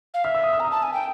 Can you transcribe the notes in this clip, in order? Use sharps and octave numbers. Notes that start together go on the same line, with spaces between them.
F5
E5 F6
E6
D#6
E6
A#5 D#6
A5
G#5
G5